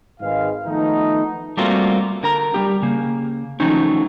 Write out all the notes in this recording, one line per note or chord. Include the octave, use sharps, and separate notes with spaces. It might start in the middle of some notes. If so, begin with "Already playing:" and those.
G#1 G#2 D#3 G#3 B4 F5
D#3 F3 A3 B3 D#4
G3 A3 A#3 C4 F4 F#4
D3 A#4 A#5
G3 A#3 G4
C#3 A#3
D#3 F3 F#3 A3 C#4 D#4